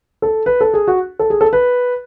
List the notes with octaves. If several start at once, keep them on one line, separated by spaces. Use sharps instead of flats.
A4
B4
A4
G#4
F#4
A4
G#4
A4
B4